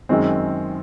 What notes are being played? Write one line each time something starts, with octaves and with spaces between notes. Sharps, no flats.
F#2 D#3 G#3 C4